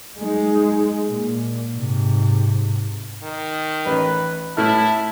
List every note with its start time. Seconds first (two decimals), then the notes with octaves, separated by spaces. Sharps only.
0.19 G#3 D#4
1.09 A#2
1.74 G#2 C3
3.23 D#3
3.86 A1 B4
4.57 A2 A3 E4 A5 F6